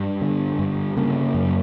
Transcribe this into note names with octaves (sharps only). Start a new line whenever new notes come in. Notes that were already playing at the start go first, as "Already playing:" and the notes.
Already playing: G2
D3
G2
C#3 A#3
F#2